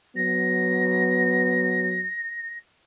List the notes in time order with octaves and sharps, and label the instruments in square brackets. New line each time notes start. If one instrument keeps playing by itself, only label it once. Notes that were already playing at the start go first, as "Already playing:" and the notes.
[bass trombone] F#3 [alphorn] B3 [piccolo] A#6